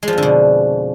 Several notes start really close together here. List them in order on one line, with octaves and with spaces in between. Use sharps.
G#3 F3 F2 D3 B2